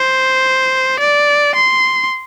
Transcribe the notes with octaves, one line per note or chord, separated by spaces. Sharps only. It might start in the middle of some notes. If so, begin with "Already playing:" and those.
Already playing: C5
D5
C6